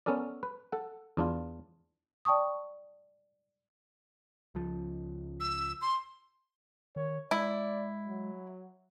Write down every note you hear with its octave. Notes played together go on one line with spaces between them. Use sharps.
B3 C#4 A4 A#4 D5
B4
A4 F#5
E2 D4 F4
D5 G5 A5 C#6 D#6
C#2 F3
E6
C6
D#3 C#5
G#3 E4 D5
F#3